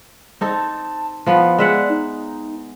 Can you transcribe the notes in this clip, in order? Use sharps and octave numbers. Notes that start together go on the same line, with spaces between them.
C4 D#4 A4 A5
F3 B3 B4 F5
G#3 D5 E5 F#5
D#4